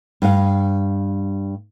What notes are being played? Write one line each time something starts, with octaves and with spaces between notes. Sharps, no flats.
G2 F5